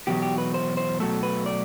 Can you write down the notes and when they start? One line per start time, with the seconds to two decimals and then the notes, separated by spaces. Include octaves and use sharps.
0.07 E2 B2 F#3 G4
0.22 G4
0.38 B4
0.54 C5
0.77 C5
1.00 B2 F#3 A3 A4
1.23 B4
1.46 D5